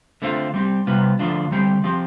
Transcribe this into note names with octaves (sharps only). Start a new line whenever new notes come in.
D3 A3 C4 F4
G3 C4 G4
C3 G3 B3 F4
D3 F3 A3 D4 F4
D3 G3 C4 G4
F3 C4 G4